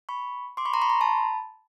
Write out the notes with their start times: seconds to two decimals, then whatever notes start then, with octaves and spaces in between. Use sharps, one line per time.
0.09 B5 C#6
0.57 C6 D6
0.65 B5 C#6
0.74 A#5 C6
0.82 B5 C#6
0.90 A#5 C6
1.01 A5 B5